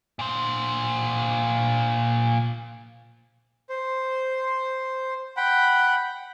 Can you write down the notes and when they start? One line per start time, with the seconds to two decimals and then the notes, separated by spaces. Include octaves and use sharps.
0.19 A#2 C5
3.69 C5
5.37 F#5 G5 B5